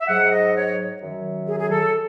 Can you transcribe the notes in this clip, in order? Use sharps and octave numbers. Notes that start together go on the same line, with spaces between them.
E5
G#2 F#3 F#5
D#5
C#5
F#2 D#3 F#3
G#4
G#4
A4